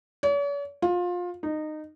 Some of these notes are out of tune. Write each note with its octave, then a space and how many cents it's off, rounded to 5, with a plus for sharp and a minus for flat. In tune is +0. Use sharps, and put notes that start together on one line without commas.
C#5 +45
F4 +25
D#4 -20